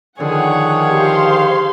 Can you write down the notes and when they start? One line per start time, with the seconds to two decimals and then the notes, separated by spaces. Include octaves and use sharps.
0.20 D3 D#3 F3 G#4 C#5 F#5
0.91 G4 C5 F5 C6